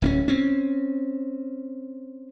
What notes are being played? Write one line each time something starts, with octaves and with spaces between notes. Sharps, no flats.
D1 C4 C#4
C4 C#4